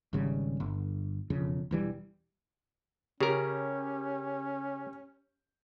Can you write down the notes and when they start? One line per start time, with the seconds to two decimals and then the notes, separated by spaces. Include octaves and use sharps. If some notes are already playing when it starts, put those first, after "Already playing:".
0.13 G#1 C#3 G3
0.60 G1
1.30 E1 F2 C#3
1.71 E1 E3 G3
3.20 C#3 C#4 G4 A#4